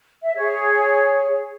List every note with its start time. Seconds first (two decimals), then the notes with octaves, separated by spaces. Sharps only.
0.22 E5
0.36 G#4 C#5